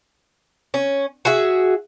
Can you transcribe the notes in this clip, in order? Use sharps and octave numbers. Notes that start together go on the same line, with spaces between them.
C#4
F#4 G#4 E5